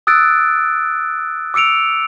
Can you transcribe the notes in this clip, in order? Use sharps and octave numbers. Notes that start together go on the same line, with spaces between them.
D#6 E6 F#6 A6 D7
D6 E6 C#7 D7 F7